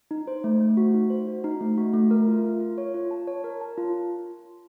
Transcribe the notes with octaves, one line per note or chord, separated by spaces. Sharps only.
D#4
C5
A3
A3
F#4
D#4
C5
F#4
D#4
A3
F#4
A3
A#4
F4
F4
F4
C#5
F4
A5
C#5
A#4
A5
F4